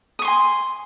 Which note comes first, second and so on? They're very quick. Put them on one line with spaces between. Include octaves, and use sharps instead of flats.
D#6 C#6 C6 G#5